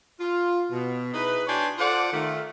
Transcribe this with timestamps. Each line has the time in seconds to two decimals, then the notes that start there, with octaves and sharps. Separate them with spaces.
0.19 F4
0.72 B2
1.14 D#4 E4 G#4 B4
1.47 D4 F#4 C#5 G5 G#5 C6
1.78 F4 A4 C5 D5 F#5
2.13 D#3 A3 F4